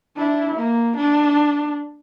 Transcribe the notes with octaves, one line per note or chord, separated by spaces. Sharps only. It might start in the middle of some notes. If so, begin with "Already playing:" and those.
D4 E4
A#3
D4